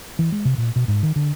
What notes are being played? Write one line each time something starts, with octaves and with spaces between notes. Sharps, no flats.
E3
G#3
C3
A#2
B2
G#2
D#3
D3